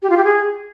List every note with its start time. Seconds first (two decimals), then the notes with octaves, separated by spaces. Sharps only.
0.02 G4
0.10 F4
0.17 G4
0.24 G#4